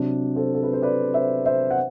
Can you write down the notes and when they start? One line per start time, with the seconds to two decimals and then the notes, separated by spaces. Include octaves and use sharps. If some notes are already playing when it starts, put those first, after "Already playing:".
Already playing: C3 F#3 D4
0.35 A4 C5
0.54 A4
0.63 B4
0.73 C5
0.82 B4 D5
1.14 C5 E5
1.45 C5 E5
1.71 F#5